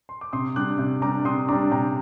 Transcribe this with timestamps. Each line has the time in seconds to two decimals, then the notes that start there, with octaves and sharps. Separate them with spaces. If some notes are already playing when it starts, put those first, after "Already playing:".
0.09 C6
0.21 D6
0.33 C3 C6 D#6
0.56 G3 D4 D6 F#6
0.79 C3
1.02 G3 D4 A#5 D6
1.25 C3 C6 D#6
1.48 G3 D4 A#5 D6
1.71 C3 G5 A#5